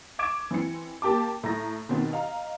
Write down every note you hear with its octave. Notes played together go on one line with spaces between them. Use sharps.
C#6 D6 G#6 D7 E7
E3 C4 C#7
A#3 G4 A5 D6
A2 A#5 A#6
B2 D#3 C4
D#5 F5 A#5